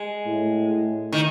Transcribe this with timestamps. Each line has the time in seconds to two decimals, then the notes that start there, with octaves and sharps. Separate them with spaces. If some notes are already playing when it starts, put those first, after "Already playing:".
Already playing: G#3
0.27 A2
1.12 D#3